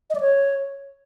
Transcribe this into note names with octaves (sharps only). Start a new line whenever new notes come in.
D#5
D5
C#5